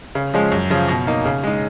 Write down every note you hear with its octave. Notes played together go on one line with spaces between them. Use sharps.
C#3
F3 G#3 C#4
F#2
C#3 F3
B2
A#3 D#4
C#3
G#3 D#4